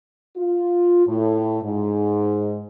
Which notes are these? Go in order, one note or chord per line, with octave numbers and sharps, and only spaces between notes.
F4
A2
G#2